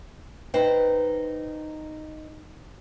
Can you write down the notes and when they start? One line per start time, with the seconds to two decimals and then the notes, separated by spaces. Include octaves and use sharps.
0.54 D#4 B4 C5 G5